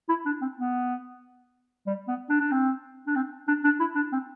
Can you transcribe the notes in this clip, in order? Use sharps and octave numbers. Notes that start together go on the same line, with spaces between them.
E4
D4
C4
B3
G3
B3
D4
D4
C4
D4
C4
D4
D4
E4
D4
C4